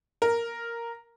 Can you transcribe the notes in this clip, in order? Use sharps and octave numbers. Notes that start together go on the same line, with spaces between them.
A#4